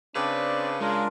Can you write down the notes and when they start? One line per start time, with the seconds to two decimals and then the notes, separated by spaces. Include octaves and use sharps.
0.16 C#3 C4 D4 B4 D5
0.81 G#3 D4 F4 A#4